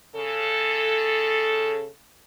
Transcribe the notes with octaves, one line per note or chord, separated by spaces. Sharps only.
C#3 A4